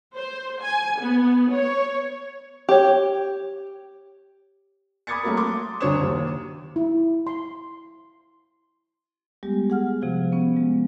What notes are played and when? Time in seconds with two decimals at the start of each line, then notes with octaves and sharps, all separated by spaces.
0.15 C5
0.62 G#5
1.00 B3
1.52 C#5
2.69 G4 C#5
5.07 B5 D6 D#6 G#6 A6 C#7
5.23 F#3 A3 A#3 F#4 A#4
5.37 C6 D6
5.80 D2 F#3 D4 C#5 D#6 E7
6.01 D#2
6.76 E4
7.27 C6
9.43 G3 G#3 B3 G4
9.70 G#4 F#5 F6
10.02 C3 F3 F#4
10.32 B3 C#4
10.57 G#3